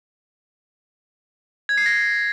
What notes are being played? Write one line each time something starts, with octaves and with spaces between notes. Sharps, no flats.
G#6
C7
A#6